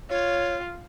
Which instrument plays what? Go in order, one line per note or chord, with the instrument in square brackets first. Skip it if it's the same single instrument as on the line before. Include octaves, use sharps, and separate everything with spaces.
[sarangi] F4 [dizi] C#5